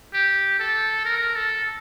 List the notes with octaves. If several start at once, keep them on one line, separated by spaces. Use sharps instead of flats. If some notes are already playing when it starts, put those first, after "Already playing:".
G4
A4
A#4
A4